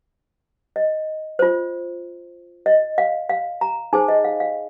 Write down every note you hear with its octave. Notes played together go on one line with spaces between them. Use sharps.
D#5
F4 C5
D#5
F5
F5
A#5
D#4 G#4 C5 G#5
D#5
F5
F5